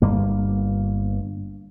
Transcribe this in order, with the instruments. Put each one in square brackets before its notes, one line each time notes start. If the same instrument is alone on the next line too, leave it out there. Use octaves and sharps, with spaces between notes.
[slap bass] G1 G2 A#3